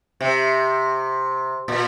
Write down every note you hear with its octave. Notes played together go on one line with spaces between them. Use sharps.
C3
A#2